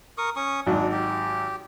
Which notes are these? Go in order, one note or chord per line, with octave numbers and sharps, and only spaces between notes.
A#4 C#6 D#6
C#4 C#6 D#6
G#1 F#3 D4 D#4
G4